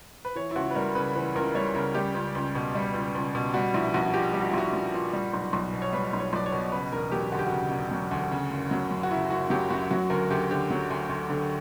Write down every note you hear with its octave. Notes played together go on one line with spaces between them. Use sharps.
B4
E3 C#5
E4
C#2 F#4
B4
G3 A#4
C#3 B4
E3 B4
C#2 A#4
G3 C#5
C#3 A#4
G3 G4
C#2
C#2
B2
G3
C#2
C#2
B2
G3 F#4
A#1 E4
A#1 F#4
A#2 G4
G3 G4
F#4
E4
A#1 F#4
A#1
A#2
G3
B1
B1
B2
C#5
G3 B4
B1
C#5
B1 D5
C#5
B2
C#3 B4
E1 A#4
F#3 G4
D2 F#4
G4
F#4
C#3
E1
F#3
D2
C#3
F#1
F#3
F#2
F#4
C#3 E4
F#1 F#4
F#3 G4
F#2 F#4
F#3 F#4
D2 A#4
D2 G4
D3 G4
F#3
D2
D2
D3